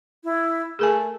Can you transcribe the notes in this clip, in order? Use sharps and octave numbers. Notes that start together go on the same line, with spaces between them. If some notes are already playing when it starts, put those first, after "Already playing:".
E4
A3 G#4 A#4 G#5